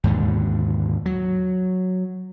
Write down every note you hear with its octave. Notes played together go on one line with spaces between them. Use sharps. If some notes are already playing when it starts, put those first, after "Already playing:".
D#2 G#2 B2 D3
F#3